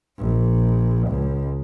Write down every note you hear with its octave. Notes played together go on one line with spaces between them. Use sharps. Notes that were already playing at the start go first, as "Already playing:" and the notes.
A#1
C#2